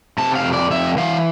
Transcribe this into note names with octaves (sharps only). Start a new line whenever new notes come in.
C3 A5
F5
F2
D5
F2 E5
E3 F5